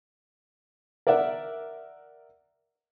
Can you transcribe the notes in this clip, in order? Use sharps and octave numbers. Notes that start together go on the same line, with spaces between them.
A#4 D5 E5 F#5